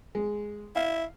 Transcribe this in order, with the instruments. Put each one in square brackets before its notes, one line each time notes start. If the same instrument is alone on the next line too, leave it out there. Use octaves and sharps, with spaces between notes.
[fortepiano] G#3
[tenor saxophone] E4 [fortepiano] F5